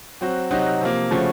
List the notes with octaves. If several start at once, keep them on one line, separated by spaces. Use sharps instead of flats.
F#3 C4 F#4
C3 F#3 C4 D#4 F#4
C3 F3 A#3
C#3 F3 A3 C#4 F#4